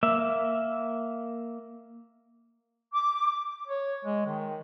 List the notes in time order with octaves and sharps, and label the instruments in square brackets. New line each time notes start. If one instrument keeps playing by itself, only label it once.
[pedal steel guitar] A#3 E5
[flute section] D6
[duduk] C#5
G#3
D#3